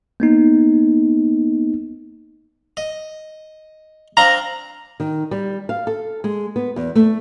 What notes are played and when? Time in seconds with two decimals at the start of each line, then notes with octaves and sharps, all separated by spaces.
0.20 A#3 B3 D#4
2.77 D#5
4.17 C4 D4 F5 A#5
5.00 D#3
5.31 G3
5.69 F5
5.87 A4
6.24 G#3
6.56 B3
6.76 E2
6.95 A3